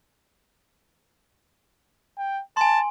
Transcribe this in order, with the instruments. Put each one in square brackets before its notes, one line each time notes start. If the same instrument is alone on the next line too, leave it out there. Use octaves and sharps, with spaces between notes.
[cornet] G5
[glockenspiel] G#5 C6 [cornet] A5